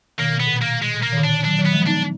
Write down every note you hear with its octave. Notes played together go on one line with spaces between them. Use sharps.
B2 D#3 A#3
B2
B3
A#2
B2 A#3
G#3
A#2
B2 A#3
D#3
A#2 D3
D4
D#3 F#3 D4
D#3 F#3
B3
F3 G#3
B3 D4 D#4